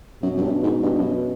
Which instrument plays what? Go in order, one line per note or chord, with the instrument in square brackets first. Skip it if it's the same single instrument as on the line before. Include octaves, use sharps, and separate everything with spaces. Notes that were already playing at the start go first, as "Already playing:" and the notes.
[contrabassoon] F#2 [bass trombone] B2
[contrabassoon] F#2
G2
G#2
G2
F#2